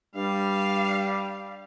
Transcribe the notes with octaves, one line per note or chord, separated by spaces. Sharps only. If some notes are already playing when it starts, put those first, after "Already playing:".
G2 G3 F5